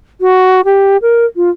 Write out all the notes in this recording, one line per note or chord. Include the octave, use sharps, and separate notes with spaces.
F#4
G4
A#4
F4